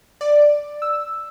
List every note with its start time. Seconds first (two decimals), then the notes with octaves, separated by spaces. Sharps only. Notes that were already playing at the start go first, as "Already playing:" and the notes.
0.21 D5
0.82 E6